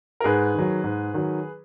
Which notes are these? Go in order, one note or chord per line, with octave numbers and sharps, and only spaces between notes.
A#4
G#2 G#4 B4
D#3 F#3
G#2
D#3 F#3